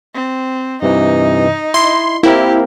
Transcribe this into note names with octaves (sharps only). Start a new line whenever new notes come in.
C4
G2 C3 E3 D#4
E4 C6
A#3 C4 E4 G4 A#4